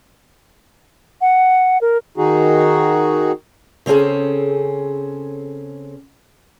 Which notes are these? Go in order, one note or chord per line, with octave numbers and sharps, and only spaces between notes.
F#5
A#4
D#3 D#4 F#4 G#4
C#3 C4 C#4 G#4 A4